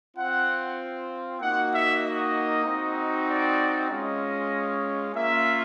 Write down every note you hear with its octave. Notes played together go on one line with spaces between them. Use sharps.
C4 F4 F#5
A#3 D#4 F#4 F#5
E5
D#5
C4 D#4 F#4
D5
G#3 C#4 F4 D#5
A#3 C#4 F4 E5